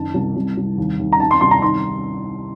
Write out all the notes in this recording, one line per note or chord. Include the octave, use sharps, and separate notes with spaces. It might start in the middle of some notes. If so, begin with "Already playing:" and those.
Already playing: F#1 D#3 A5
C2
C2
C2
D#2
D#2
A#5
D#3 A5
C6
C2 C6
A#5
D#3 C6